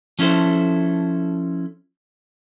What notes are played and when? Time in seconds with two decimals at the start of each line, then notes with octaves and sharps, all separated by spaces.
0.19 F3 C#4 E4 A4 C5